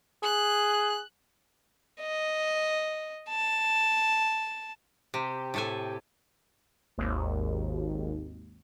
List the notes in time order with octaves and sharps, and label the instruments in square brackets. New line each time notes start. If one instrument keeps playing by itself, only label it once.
[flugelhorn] G#4 [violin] F#6
[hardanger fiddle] D#5
A5
[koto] C3 [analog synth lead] G4
[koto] A2 A4 G#5
[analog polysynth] G#1 D#2